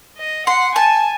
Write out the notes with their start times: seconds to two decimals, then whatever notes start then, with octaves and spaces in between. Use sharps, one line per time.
0.18 D#5
0.47 F#5 C6
0.75 G#5 A5